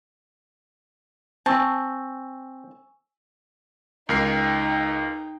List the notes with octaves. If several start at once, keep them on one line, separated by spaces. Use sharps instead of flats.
C4 G#5 A5 C#6 E6
C#2 D#4 A#4 G5 C7